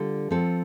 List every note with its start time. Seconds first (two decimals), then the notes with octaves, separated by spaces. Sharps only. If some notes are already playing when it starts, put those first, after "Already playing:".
Already playing: D3 G3 F4 A4
0.31 F3 C4 F4 A4